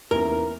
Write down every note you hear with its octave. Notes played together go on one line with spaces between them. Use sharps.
E2 D#3 A#3 C#4 E4 A#4